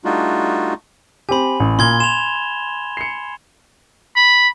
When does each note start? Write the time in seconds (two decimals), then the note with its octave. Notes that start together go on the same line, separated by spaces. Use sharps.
0.05 G3 A3 D4 D#4 F4 F#4
1.29 C4 G4 G#5 B5
1.60 A1
1.79 A#2 C6 G#6 G7
2.00 C6 E7 F7
2.97 C7 C#7
4.16 B5